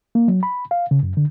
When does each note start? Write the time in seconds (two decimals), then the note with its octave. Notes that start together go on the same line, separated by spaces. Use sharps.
0.15 A#3
0.28 F#3
0.43 B5
0.71 F5
0.91 C#3
1.03 F#2
1.17 D3